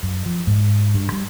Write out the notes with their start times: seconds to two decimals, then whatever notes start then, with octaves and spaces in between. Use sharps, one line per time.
0.03 F#2
0.26 F3
0.47 G#2
0.94 G2
1.12 G3